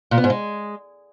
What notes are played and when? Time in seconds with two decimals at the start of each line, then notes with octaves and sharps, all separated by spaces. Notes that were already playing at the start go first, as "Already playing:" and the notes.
0.11 A#2
0.18 B3
0.24 G#2
0.30 G#3